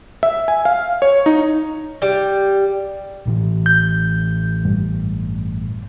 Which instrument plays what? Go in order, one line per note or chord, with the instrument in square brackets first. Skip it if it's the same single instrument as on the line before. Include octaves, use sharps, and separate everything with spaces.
[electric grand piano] E5
G#5
F5
C#5
D#4
[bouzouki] G3
[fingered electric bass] A1 A2 E3
[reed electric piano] G6
G2